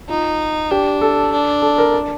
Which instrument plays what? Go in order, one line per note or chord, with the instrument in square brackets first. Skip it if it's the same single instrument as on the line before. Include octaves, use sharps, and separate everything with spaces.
[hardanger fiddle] D#4 [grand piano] F4
[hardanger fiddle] D4 [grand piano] G4
[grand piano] A4
[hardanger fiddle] D4
[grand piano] A4
A#4
A5